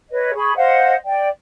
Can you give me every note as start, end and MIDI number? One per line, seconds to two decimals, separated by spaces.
0.11 0.31 71
0.11 0.31 73
0.11 0.31 75
0.36 0.56 68
0.36 0.56 83
0.36 0.56 85
0.56 0.95 72
0.56 0.95 75
0.56 0.95 77
0.56 0.95 78
1.06 1.28 74
1.06 1.28 79